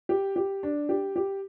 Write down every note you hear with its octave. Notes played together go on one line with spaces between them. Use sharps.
G4
G4
D4
G4
G4